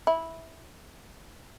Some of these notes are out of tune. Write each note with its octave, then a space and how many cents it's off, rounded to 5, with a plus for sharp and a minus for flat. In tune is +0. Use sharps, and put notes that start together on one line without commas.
E4 -10